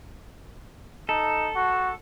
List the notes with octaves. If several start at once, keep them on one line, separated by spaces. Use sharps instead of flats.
D#4 A4
F#4